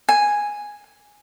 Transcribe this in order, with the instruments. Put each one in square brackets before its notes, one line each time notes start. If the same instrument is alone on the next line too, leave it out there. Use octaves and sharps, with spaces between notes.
[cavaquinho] G#5